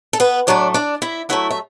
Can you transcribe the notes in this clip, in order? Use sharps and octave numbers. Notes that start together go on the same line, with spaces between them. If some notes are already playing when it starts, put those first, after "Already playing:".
A4
B3 B4
A2 F#3 A3 D4 D5
D4 D5
E4 E5
A2 F#3 A3 E4 E5
E5